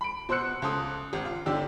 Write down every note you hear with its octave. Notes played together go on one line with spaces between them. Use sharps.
B5 D7
B2 C5 C6 E6 F#6 C#7
C#2 A4 C6 D#6
G#1
F4
G1 D3 D#4 G4 D5 E6